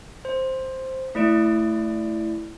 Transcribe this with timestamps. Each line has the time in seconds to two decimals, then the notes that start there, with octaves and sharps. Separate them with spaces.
0.25 C5
1.15 A3 E4 D5 D7